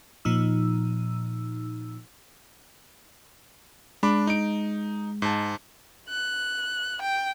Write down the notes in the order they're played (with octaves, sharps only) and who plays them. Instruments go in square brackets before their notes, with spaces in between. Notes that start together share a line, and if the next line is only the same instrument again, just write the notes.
[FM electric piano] A#2 F3 D#4 E6
[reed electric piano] G#3 [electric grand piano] D4 B5 D6
[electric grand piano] D#4 D7
G#2 A5
[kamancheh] F#6
G5